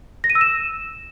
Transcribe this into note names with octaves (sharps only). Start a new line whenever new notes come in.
A#6
D#7
E6
E7